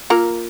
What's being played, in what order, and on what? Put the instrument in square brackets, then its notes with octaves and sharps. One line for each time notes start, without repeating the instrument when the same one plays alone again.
[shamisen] A#3 A#4 [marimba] F4